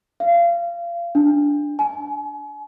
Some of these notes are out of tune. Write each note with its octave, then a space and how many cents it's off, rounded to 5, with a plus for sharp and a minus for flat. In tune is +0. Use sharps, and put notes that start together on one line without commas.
F5 -25
D4 -10
G#5 +40